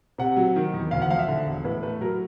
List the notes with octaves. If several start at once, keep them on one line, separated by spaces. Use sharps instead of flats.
C3 F#5
F#3
D#3
E2
D2 F5
F#5
F3 F5
E5
D3
E1
A2 B4
A3 B4
F#3 A#4